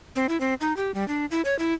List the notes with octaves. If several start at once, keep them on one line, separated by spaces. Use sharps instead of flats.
C4
E4
C4
D#4
G4
G3
D4
E4
C#5
E4